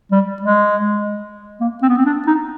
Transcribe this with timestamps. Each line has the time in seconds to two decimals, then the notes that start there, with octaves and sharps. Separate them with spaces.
0.11 G3
0.42 G#3
1.60 A#3
1.82 C4
1.89 B3
1.98 C4
2.05 D4
2.27 D#4